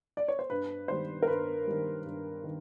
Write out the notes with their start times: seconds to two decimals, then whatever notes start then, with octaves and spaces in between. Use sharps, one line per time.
0.17 D5
0.28 C#5
0.39 C5
0.50 G2 B4
0.88 D#3 G3 C5
1.22 A#4
1.27 G2 B4
1.67 D#3 G3
2.05 G2
2.44 D#3